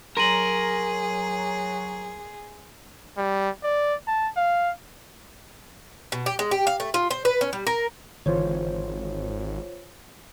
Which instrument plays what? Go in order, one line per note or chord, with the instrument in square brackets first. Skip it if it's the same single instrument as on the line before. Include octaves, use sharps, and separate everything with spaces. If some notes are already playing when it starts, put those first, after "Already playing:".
[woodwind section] F#3 [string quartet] G#4 [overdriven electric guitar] A#4 [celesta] C6 D#7 F#7
[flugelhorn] G3
D5
A5
F5
[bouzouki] B2
G4
G#3
G4
F5
A3
F4
C5
B4
C#4
G3
A#4
[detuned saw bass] G#1 [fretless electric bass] D3 E3 [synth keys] F4 C5 C#5